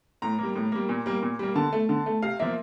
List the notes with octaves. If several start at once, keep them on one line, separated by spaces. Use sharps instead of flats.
A2 A#5
G3 A#3
A2
G3 A#3
A#2
G3 A#3
A#2
G3 A#3
D3 A5
A3
D3
A3
C3 F5
F3 A#3 E5